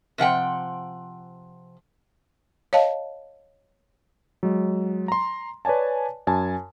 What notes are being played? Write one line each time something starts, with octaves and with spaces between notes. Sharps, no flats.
C3 F3 F#5 G5
C#5 D#5 F5 A5
F#3 G#3
A#5 C6
B4 C#5 D5 G#5 A5
F#2 G#5 A5